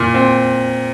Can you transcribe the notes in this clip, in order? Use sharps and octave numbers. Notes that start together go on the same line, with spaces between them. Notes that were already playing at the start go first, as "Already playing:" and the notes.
Already playing: A#2
C4